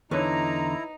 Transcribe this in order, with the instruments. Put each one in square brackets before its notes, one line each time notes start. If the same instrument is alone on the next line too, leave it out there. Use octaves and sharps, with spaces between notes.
[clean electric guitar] E2 D3 [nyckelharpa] D#4 [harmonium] E4 A#5 [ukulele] B4 C#5